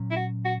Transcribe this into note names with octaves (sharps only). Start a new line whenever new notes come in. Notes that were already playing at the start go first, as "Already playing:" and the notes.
Already playing: A#2 F#3 C#4
E4
F#4
F#4